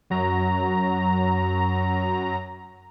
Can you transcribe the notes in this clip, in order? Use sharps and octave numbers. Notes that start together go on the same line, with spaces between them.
F#2 F#3 A#5